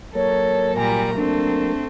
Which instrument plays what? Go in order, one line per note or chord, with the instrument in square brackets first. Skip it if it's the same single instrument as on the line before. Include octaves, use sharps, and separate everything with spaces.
[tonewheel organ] F#3 A#3 A#4 [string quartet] A4 [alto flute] C#5
[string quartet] A#2 G3 A#5 [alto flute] G#5
[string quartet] A3 C4 [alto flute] D4